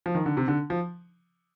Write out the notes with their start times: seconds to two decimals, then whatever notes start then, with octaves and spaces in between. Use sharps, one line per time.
0.06 F3
0.15 D#3
0.26 D3
0.37 C3
0.48 D3
0.70 F3